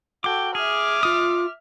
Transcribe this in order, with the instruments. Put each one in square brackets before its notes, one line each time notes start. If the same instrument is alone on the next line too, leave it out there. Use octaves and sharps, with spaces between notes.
[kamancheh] F#4 A4 [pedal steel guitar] G5 D6
[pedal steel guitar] G#4 [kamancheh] E5 F6 [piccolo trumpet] D6
[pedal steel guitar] F4 D#6